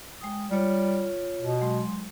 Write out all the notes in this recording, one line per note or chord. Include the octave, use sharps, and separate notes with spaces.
G#3 G5 D#6
G3 F4 C#5
B2
F#3 G#3 C6